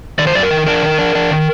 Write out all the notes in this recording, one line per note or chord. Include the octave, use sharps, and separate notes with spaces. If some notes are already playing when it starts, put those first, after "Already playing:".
D#3 D5
C5
F#2 D5
A#4
D#3
D4 A#4
D#3
D4
D4
D#3